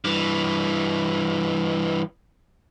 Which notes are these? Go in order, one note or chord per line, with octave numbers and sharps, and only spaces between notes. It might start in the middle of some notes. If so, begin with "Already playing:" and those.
G2 E3